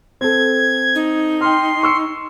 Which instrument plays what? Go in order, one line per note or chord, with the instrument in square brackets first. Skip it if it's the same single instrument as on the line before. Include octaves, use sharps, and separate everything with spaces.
[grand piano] C4 A4 [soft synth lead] G#6
[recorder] D#4
[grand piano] G5 F6 [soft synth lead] C6
[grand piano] C#6 E6 C#7